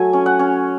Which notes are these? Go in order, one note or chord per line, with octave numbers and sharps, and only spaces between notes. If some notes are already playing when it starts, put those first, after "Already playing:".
Already playing: F#3 A3 G#5
C#4
F#5
C#4